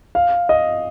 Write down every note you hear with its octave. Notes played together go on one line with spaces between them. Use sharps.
F5
D#5